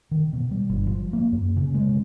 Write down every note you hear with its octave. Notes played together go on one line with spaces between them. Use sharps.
D#3
B2
G3
G1
F3
A#3
F#2
C#3
G#3
C#3